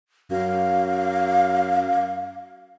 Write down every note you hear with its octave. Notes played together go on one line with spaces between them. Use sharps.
F#2 F5